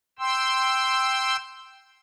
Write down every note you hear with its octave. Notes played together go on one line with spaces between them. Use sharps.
G5 C6 E6